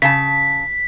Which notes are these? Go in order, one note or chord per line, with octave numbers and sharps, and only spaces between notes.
C#3 A5 B6